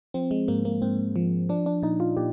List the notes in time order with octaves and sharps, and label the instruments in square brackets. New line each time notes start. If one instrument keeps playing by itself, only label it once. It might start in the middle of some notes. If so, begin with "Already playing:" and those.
[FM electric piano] F3 C4
G#3
G#2 A#3
A#3
G#2 C4
F3
F3 D4
D4
A#2 D#4
F4
A#2 G4